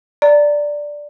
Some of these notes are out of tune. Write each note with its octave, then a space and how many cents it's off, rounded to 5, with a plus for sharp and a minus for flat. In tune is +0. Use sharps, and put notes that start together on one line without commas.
D5 +0 A#5 -25